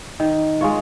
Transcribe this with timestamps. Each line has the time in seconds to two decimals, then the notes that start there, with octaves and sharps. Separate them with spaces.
0.20 D#3
0.61 G#3 F4 C#5